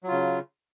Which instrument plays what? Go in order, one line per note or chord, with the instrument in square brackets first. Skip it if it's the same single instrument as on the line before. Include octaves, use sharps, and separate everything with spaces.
[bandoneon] F#3
F4
C#3